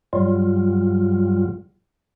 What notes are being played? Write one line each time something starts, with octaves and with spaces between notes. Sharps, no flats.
G2 F#3 G3 F4